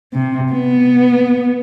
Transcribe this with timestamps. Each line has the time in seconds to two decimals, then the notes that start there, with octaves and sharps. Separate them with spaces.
0.13 C3
0.52 B3